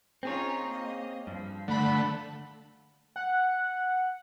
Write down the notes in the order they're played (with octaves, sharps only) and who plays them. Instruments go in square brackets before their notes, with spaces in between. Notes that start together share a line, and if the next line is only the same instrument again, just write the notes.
[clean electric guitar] C4 G#4 C#5 [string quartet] C#4 D#4 F4
[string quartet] A#3 D#5
[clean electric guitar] G2 [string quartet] F3
[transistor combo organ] D3 A3 [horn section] F#5 B5
[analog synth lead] F#5